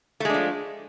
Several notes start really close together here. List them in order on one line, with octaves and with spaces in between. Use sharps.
A3 G#3 D4 F3